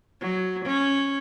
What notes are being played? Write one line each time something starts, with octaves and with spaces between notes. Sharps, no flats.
F#3
C#4